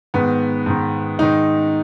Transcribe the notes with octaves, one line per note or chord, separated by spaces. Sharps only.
G#2 D#3 B3
G#2 D#3
G#2 D#3 D#4